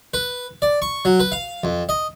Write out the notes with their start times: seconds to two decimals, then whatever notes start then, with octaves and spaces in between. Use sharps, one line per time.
0.14 B4
0.62 D5
0.82 C#6
1.05 F#3
1.20 B4
1.32 F5
1.64 F2
1.89 D#5